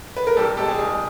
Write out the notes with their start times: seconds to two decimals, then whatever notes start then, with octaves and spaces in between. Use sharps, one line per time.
0.17 B4
0.27 A#4
0.37 C2 G4 A4
0.57 B2 G#3 G4 A4
0.68 G#4
0.78 C2 G#4